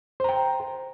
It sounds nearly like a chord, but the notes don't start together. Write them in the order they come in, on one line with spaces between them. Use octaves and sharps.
C5 A#5 G5